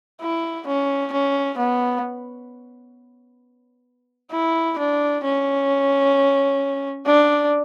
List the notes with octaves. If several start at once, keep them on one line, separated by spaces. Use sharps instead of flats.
E4
C#4
C#4
B3
E4
D4
C#4
D4